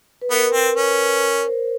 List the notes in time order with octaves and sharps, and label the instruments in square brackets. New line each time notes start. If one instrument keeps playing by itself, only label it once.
[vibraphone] B4
[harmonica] B3 [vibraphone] A#4
[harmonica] C4
C#4
[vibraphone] A#4
C#5
C5